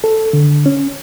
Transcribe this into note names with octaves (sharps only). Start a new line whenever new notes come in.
A4
D3
C#4